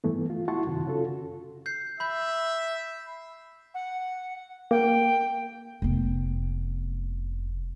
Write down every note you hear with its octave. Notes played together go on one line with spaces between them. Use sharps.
G2 E3 A3 B3
F4
E4 F#4 F#5 A5 C6 C#6
F#2 C3 D#3
C#3 C#4 F4 F#4 A4
G6 C7
E5 B5 G6
F#5
A#3 G5
F1 B3